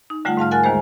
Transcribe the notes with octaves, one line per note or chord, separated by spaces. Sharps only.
D#4
D3 G3 A3 F4 F#5
G#2 F5 A5 F6
A#4 F#5 G#5 F6 F#6 A6
D#2 D#3 G#3 A#3 G#4 C5